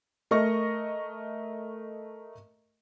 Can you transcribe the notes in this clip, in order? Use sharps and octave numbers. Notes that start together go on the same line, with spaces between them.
A3 A#4 D#5 C#6 A#6